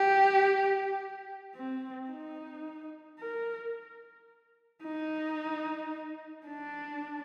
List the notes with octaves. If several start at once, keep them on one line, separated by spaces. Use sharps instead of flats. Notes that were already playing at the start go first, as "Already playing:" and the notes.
Already playing: G4
C4
D#4
A#4
D#4
D4